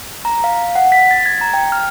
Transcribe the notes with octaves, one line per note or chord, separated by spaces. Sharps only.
A#5
F5
F#5
B6
A6
G#6
A#5
G5
F6